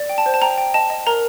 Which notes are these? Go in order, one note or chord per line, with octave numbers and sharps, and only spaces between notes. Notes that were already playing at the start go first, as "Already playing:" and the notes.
Already playing: D5
G5
A5
C5
A5
G5 A#5
G5
D#5 A5
D#5
A#4 A#5